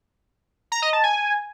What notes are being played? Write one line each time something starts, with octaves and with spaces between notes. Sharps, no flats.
A#5
D#5
A5
G#5